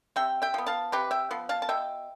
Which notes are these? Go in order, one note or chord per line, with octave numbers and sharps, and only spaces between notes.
C3 E5 G5
E5 G5
F3 B3
F5 A5
C3 G4 B4
E5 G5
F3 B3
F5 A5
A5
B2 E5 G5